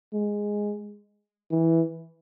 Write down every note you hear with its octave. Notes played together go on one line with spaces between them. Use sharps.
G#3
E3